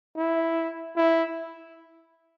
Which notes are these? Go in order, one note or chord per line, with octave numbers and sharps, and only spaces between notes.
E4
E4